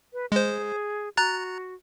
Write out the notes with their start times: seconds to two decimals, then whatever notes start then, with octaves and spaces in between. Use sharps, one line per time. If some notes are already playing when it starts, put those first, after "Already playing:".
0.13 B4
0.32 G#3 G#4 C5
1.17 F#4 A#5 F#6 A6